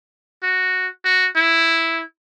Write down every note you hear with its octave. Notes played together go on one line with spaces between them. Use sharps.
F#4
F#4
E4